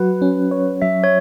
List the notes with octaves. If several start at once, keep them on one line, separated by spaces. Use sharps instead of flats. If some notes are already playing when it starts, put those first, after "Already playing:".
Already playing: F#3 F#4 B4
C#4
C#5
F#3 E5
C#5